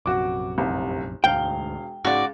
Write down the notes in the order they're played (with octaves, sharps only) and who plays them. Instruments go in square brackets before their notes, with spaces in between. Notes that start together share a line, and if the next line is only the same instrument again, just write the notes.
[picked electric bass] A#1 F#2 C3 [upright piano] F#4 D6
[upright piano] F1 C2
[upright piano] E1 F5 G7 [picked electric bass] D2 G#2 [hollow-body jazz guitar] G5
[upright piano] C#2 [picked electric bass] G#2 [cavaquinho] F#4 D5